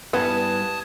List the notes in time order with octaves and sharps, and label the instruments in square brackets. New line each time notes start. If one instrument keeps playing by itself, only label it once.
[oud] G2 E3 [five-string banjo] B3 [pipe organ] A5 D#6 G#6